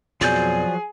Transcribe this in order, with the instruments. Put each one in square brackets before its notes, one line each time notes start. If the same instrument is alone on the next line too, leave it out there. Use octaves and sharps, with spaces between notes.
[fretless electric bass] F2 B2 [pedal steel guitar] F3 F#3 G6 [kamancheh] G#4 [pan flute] D5